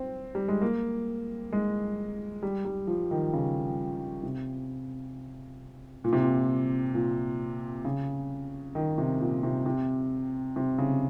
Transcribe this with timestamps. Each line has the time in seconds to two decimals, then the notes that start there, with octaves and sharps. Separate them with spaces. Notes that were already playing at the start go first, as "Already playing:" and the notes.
Already playing: C4
0.35 G3
0.48 G#3
0.62 A#3
1.52 G#3
2.43 G3
2.65 G3
2.87 F3
3.11 D#3
3.33 C#3
4.23 C3
6.04 A#2
6.13 C3
6.22 A#2
6.94 A#2
7.85 C#3
8.75 D#3
8.98 C3
9.20 A#2
9.43 C3
9.66 C3
10.56 C3
10.78 C#3